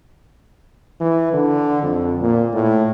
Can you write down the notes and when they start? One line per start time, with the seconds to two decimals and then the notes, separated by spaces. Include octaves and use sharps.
1.00 E3
1.33 D3
1.82 F2
2.21 A#2
2.53 A2